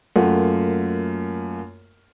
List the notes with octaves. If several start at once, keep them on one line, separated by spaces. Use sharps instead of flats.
F#2 A3 A#3 F4 F#5